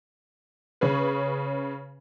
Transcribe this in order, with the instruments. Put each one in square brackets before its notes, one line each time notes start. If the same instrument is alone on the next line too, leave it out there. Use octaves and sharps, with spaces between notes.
[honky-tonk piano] C#3 C#4 G#4 B4